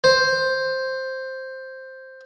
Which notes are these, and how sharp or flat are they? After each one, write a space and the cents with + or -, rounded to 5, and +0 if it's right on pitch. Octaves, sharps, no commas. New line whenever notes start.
C5 +5